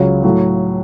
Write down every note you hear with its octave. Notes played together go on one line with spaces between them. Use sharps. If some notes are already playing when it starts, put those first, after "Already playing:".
Already playing: C#2 C#3 F#3
A2 F#3